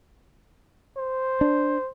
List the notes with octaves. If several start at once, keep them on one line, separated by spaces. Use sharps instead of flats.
C5
D4